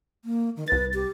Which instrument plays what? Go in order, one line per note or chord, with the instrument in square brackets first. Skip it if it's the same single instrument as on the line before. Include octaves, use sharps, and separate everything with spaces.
[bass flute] A#3
D#3
[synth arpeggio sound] C2 A6 [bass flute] B4
[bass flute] G4